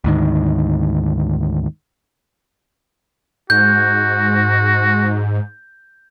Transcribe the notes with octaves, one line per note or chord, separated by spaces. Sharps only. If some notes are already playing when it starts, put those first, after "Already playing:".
D2 G#2 D#3
G#2 F#4 G6